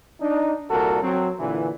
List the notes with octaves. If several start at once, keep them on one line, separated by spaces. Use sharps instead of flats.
D4 D#4
C2 A#2 F#4 A4 A#4
F#3 C4
A#2 D3 E3